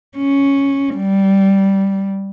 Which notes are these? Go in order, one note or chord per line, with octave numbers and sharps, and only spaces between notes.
C#4
G3